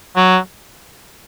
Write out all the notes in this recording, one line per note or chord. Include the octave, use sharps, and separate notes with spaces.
F#3